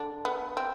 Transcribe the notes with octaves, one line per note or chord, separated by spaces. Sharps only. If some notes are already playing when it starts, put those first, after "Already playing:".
Already playing: D3 D4
B3
C4